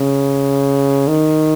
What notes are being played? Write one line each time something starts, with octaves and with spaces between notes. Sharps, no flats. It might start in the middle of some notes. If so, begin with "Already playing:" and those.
Already playing: C#3
D#3